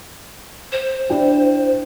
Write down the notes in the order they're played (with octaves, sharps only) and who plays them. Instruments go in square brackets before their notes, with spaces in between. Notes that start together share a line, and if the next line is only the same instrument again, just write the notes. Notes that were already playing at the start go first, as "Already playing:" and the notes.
[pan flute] C5
[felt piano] D4 E4 G5